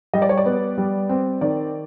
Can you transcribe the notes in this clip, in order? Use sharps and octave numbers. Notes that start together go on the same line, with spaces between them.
G3 D#5
D5
C#5
D5
B3
G3
C4
D#3 D5